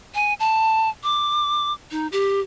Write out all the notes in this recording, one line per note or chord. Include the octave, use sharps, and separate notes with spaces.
G#5
A5
D6
D#4
G4